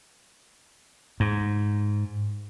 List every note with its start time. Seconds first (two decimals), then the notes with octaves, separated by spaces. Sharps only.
1.20 G#2